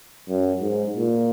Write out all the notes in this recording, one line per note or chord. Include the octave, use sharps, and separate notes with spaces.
F#2
G#2
A#2